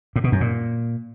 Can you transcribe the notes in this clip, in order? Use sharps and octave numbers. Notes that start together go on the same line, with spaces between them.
A2
B2
F#2
A#2